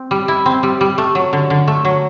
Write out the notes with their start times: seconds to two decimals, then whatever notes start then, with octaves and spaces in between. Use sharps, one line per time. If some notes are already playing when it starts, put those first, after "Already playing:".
Already playing: C4
0.11 G3
0.28 E4
0.46 C4
0.63 G3
0.81 G3
0.98 A3
1.15 F#3
1.33 D3
1.50 D3
1.68 A3
1.85 F#3